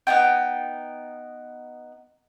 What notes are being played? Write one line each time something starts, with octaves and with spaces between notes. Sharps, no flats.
B3 C#4 D#4 G5